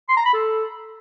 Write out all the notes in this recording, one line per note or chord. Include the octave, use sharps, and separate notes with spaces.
C6
A#5
B5
A4